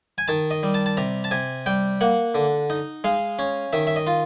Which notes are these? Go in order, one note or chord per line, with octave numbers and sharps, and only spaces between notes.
G#5
D#3 A5
D#5
G3
A5
A5
C3 A#5
A5
C3 G#5
G3 G5
A#3 F#5
D3
D#4
G#3 F5
C#4
D#3 E5
E5
D#5
F4